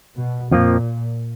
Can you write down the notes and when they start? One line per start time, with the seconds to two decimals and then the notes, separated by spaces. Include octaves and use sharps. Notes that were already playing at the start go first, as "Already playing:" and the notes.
0.16 B2
0.51 F2 A#2 F3 A#3